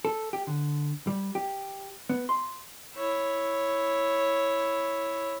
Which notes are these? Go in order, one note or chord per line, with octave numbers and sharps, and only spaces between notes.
A4
G4
D3
G3
G4
B3
C6
E4 C#5